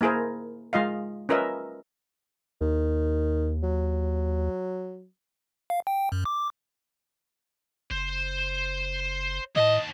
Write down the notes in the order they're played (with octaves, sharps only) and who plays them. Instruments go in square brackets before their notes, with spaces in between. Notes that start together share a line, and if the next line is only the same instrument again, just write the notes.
[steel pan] A#3 E4 G#4 A#4 C5
G#3 F4 D#5 F5
C#4 F4 A#4 B4 D#5 E5
[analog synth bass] D#2 [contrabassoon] D#3
[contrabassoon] F#3
[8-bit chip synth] F5
G5
F#2
D6
[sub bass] F#1 [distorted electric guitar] C5
[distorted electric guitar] D#2 A5 [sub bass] A2 [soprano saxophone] D#5